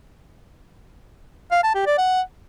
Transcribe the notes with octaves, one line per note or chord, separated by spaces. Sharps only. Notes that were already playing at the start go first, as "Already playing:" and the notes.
F5
A5
G4
D5
F#5